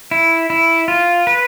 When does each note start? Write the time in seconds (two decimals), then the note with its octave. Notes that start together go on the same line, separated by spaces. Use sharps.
0.11 E4
0.50 E4
0.88 F4
1.27 B4